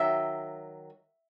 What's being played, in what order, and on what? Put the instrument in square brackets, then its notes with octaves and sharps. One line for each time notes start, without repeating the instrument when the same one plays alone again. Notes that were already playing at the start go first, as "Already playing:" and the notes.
Already playing: [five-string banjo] D#3 F#3 E5